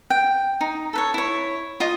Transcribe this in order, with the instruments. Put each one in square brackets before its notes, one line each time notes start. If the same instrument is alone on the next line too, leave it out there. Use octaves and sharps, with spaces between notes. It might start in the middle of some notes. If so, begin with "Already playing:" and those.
[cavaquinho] G5
D#4
A4 B4 C#5
E4 C#5
F4 D#5 D#6